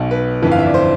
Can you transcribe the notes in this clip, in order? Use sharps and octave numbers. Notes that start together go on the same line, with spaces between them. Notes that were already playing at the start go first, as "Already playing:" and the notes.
Already playing: B1 B2
B4
G1 F2 E3 B4
F5
E5
D5
C5